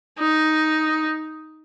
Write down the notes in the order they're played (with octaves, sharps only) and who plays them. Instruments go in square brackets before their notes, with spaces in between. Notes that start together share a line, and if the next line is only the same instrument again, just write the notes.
[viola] D#4